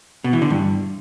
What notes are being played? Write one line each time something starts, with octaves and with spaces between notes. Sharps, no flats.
B2
E3
D3
G2